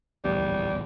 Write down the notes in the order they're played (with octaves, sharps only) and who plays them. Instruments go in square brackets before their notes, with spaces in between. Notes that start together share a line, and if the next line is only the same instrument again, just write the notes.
[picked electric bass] D1 A#1 E2 [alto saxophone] G3